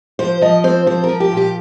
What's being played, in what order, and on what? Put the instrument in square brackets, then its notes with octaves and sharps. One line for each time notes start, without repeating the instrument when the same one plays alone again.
[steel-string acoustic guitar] F3 C5
F3 D#5
C4 C5
F3 C5
A#4
F3
G4
A#2
G4